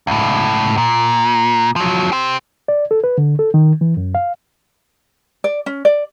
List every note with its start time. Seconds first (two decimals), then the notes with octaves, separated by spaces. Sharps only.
0.07 C#2 A2
0.77 A#2
1.76 F3 F#3
2.12 G4 C5
2.68 D5
2.91 A4
3.04 B4
3.18 D3
3.39 A4
3.54 D#3
3.81 E3
3.97 F#2
4.15 F5
5.44 D5
5.66 C#4
5.85 D5